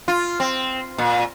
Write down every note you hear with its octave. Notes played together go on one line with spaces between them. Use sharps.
F4
C4
A#2